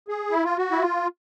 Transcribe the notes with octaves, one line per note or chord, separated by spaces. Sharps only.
G#4
E4
F4
F#4
E4
F4